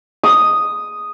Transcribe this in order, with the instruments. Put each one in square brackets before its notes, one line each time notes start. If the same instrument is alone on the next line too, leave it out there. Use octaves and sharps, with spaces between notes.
[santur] D#6